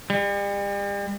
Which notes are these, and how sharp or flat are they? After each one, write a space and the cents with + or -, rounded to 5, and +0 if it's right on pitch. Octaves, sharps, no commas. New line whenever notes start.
G3 +40